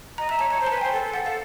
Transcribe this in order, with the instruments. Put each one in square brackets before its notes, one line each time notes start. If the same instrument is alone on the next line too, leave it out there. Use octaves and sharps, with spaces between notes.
[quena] D#5 [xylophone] A#5
[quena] E5 [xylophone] A#5
[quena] C#5 [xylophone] A5
[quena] C#5 [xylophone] A#5
[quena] C5
[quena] B4 [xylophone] A5
[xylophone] G#5
[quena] C5 [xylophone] G5
[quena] A4
A4
[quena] A4 [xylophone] F#5
[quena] A4 [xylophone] F5